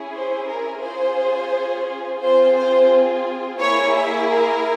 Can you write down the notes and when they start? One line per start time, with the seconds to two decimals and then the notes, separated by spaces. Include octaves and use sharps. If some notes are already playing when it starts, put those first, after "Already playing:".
Already playing: C#4 E4 G#4
0.13 C5
0.48 A#4
0.82 C#4 F4 G#4 C5
2.21 C4 F4 G#4 C5
2.56 C5
3.60 A#3 E4 G#4 C#5
3.95 E5
4.30 A#4